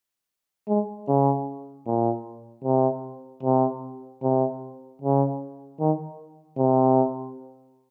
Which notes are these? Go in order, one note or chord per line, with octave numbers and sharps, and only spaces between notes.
G#3
C#3
A#2
C3
C3
C3
C#3
D#3
C3